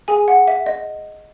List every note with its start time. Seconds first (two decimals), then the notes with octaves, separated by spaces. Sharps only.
0.08 G#4 G#5
0.28 F#5
0.48 E5
0.66 D#5